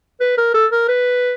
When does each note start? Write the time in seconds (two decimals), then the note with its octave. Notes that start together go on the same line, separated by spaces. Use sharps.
0.20 B4
0.38 A#4
0.54 A4
0.72 A#4
0.88 B4